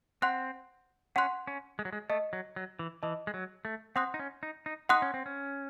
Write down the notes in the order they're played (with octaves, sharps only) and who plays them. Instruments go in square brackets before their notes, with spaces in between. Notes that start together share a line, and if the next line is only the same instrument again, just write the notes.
[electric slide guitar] C4 [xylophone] F#5 C6 F#6
[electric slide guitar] C#4 [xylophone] F#5 C6 F#6
[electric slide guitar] C#4
G#3
F#3
G#3
[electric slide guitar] A3 [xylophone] D#5 A5 D#6
[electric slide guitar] F#3
F#3
E3
[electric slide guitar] E3 [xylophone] D#5 A5 D#6
[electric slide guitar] G#3
F#3
A3
[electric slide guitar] C4 [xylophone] F#5 C6 D#6 F#6
[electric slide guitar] D#4
C#4
D#4
D#4
[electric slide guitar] D#4 [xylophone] F#5 C6 D#6 F#6
[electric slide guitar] C#4
C4
C#4